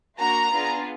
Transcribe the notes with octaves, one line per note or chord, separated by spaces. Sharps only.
A#3 D4 F#4 A#5
B3 D4 F4 G#4